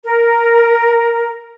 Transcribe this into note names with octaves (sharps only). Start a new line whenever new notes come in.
A#4